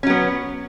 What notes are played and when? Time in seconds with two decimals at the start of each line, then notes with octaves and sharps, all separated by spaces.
0.03 C#4
0.07 F#3
0.10 B3